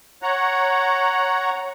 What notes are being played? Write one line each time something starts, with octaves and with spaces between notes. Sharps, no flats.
C#5 F#5 A#5